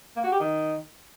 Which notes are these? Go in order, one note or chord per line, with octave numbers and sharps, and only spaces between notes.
A#3
F#4
G4
D#3